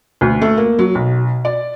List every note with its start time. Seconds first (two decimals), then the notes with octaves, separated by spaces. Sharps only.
0.21 D2
0.41 A3
0.57 A#3
0.79 F#3
0.95 B1
1.45 D5